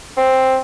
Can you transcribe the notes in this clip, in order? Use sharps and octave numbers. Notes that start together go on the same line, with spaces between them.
C4